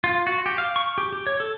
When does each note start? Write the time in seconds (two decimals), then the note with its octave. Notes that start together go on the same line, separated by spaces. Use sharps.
0.04 F4
0.27 F#4
0.46 G4
0.58 F5
0.76 C#6
0.98 G4
1.13 G4
1.27 C#5
1.40 A4